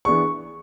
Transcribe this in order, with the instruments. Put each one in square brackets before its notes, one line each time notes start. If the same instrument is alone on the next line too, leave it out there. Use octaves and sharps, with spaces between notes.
[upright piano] E3 B3 D4 G#4 [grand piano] C#6